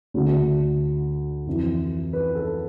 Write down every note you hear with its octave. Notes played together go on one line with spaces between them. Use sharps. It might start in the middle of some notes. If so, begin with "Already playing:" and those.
D2 D3
F2 E3
B4
A4